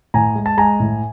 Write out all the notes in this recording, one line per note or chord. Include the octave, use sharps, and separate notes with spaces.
A2 G#5 A#5
G#3
A5
G#3 G#5 A#5
A2